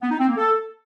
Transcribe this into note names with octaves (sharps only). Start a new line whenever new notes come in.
B3
D#4
C4
A#3
A4